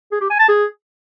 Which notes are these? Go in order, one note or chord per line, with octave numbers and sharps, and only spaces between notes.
G#4
G4
G#5
A5
G#4